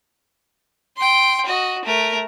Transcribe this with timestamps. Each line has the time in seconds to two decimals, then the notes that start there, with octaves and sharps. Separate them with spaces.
0.97 G5 C6
1.46 F#4 D#5
1.85 A3 A#4